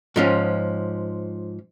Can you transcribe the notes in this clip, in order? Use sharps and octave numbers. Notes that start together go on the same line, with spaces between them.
G#2 F3 C#4